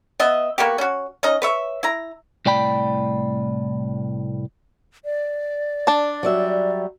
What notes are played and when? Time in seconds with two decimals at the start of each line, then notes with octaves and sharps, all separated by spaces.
0.20 B3 D#5 E5
0.58 A#3 B3 F#4 G4
0.78 C#4 F#4
1.23 C#4 D#4 D#5
1.42 B4 C#5 E5
1.83 E4 A#5
2.46 C2 A2 D5 G5 B5
5.05 D5
5.87 D4 A5
6.23 F#3 G3 E5